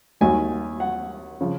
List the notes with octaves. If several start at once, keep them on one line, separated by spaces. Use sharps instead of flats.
D#2 D#3 F#3 G#5
F#5
C#3 F3